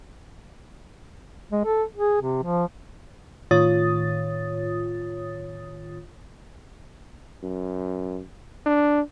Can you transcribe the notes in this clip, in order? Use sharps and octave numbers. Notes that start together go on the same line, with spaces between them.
G#3
A4
G#4
C3
F3
A2 D#3 F4 C#5 D#6 A6
F#2
D4